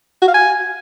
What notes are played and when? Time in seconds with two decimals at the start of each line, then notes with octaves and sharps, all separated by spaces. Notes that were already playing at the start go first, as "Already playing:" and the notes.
0.22 F#4
0.28 F5
0.34 G#5